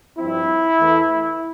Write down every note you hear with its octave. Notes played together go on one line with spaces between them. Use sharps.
G2 F3 C4 E4
E2 E3 A3